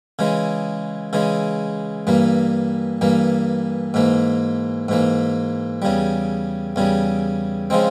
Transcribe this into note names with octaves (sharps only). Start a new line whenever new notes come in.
C#3 E3 G#3
C#3 E3 G#3
G2 E3 A#3
G2 E3 A#3
G#2 E3 A#3
G#2 E3 A#3
E2 C#3 G3
E2 C#3 G3
C#3 F3 G#3 C4